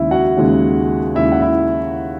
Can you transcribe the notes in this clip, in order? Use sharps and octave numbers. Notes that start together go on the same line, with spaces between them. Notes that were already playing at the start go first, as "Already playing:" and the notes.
Already playing: D#2 C#3 G#3 E4 E5
F#4 F#5
D#2 C#3 G#3
D#2 C#3 G#3 E4 E5
F#5
E4 E5